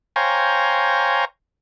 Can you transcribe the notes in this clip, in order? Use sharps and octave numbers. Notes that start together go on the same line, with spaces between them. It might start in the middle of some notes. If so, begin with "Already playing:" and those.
C5 C#5 F5 G5 G#5 A#5